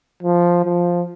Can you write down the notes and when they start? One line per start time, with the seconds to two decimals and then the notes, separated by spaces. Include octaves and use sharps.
0.23 F3
0.65 F3